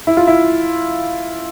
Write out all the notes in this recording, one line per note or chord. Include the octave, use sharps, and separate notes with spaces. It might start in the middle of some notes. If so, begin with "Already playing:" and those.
E4
F4
E4